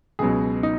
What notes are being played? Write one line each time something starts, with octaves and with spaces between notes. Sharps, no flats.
C#2 B2 F#3 G#4
D#4